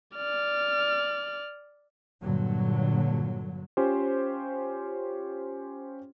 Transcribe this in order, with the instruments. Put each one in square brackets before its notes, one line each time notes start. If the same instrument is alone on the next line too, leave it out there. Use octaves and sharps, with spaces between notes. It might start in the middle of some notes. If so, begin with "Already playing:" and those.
[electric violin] D5 F6
[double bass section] G2 A#2 D3 F#3
[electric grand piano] C#4 F4 G4 C5